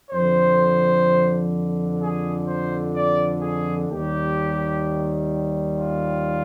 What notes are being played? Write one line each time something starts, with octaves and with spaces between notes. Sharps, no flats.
F2 D3 F3 C5
G#4
C5
D5
G#4
D#2 D#3 G3 G4
F4